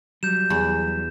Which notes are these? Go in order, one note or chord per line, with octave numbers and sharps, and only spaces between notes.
F#3 G3 G6 E7
E2